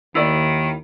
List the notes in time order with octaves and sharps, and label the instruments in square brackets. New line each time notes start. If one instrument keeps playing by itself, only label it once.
[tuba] D#2 [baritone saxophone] D#3 [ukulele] E4 D5